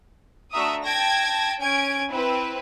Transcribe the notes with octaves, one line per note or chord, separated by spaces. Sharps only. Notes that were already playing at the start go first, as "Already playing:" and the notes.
A3 D4 F#4 E5 A#5 D#6
G5 A5 G#6 A#6
C#4 G#5 G#6 D7
C4 E4 B4